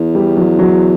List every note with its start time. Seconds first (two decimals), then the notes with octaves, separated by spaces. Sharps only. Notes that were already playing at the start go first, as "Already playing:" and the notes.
Already playing: E2
0.15 G3
0.37 F#3
0.59 F#3